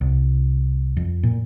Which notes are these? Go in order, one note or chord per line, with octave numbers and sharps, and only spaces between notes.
C2
F2
A#2